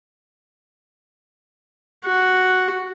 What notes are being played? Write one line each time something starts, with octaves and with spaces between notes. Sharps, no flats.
F#4